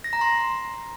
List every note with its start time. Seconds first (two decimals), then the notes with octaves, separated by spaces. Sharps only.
0.04 A#6
0.13 A#5
0.21 C6